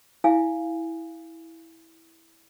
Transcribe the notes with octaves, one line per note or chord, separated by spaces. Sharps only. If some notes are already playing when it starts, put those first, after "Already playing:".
E4 F5 G#5